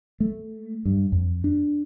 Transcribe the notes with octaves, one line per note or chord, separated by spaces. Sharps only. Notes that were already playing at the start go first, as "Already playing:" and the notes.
A3
G2
F2
D4